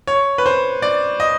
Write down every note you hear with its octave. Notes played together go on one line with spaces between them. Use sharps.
C#5
B4
C5
D5
D#5